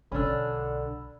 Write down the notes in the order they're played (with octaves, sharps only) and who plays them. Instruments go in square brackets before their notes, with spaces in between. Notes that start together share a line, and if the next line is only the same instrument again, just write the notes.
[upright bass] B1 [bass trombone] D3 [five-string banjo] C#4 D4 [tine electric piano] B5 E6